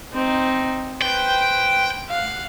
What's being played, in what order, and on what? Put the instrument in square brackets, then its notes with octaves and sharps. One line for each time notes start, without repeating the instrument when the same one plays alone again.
[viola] C4 D#4
[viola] B4 C5 [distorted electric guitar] G5
[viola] F5 F#5